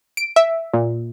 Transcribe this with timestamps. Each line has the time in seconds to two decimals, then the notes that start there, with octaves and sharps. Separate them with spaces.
0.17 D7
0.36 E5
0.73 A#2